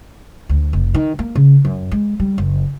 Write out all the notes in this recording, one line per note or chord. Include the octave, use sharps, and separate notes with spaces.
D2
F1
D#3
A#3
C#3
F#2
G#3
G3
F#1